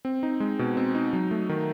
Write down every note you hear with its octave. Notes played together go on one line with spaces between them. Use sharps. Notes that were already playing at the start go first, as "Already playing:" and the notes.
C4
D#4
G#3
B2
C4
D#4
F#3
A3
D#3